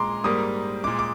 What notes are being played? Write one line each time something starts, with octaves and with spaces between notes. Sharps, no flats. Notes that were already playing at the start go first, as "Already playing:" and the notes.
Already playing: A#2 G#3 A#5 C6 D6
G#2 G3 A#3 D#6
A#2 G#3 D6
D6